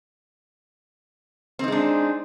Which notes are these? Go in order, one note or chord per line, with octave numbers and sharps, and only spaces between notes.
G#3 C4 D4 D#4